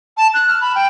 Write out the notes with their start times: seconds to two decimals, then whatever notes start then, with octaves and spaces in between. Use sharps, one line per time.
0.17 A5
0.34 F#6
0.48 F6
0.61 B5
0.75 G5